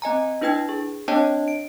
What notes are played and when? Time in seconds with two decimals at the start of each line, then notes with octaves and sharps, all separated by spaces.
0.02 C4 D#5 G#5 A#5
0.41 D4 E4 B4 G5 G#6
0.69 G#4
1.08 C4 D4 C#5 D#5 G5 A5
1.48 D7